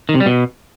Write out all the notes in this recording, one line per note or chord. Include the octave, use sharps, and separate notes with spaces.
D#3
C3
G3
B2